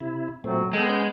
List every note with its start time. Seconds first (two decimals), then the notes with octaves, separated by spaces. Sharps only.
0.01 C3 E4
0.44 A#2 F#3 A3 C4
0.73 G#3 B3 A4 G5
0.89 C#4 G6